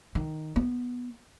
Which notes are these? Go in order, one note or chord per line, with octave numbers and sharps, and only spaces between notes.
D#3
B3